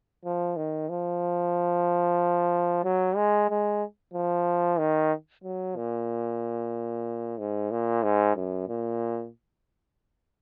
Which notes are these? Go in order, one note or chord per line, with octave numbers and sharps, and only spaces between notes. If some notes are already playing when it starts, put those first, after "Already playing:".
F3
D#3
F3
F#3
G#3
G#3
F3
D#3
F#3
A#2
G#2
A#2
G#2
F#2
A#2